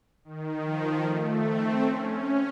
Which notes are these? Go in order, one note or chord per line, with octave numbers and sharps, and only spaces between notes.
D#3
F3
A3
C4
C#4